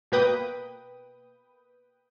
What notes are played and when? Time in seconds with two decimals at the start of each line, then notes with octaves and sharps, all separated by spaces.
0.12 B2 A#3 B4 G5 D#6